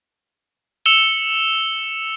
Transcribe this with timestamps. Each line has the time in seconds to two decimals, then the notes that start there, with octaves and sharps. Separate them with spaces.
0.86 E6 C#7 E7 F7 G7